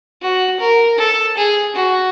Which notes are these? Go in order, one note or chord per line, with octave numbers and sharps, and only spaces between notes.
F#4
A#4
A4
G#4
F#4